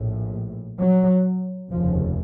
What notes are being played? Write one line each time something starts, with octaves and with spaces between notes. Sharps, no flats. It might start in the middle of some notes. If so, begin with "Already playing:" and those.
Already playing: A#1 A2
F#3
F1 D#2 C#3 F3